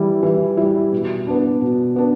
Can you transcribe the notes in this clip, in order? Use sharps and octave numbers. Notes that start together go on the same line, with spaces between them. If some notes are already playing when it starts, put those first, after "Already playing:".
Already playing: E3 G3 E4
E3
G3 E4
B2
B3 D4
B2
B3 D4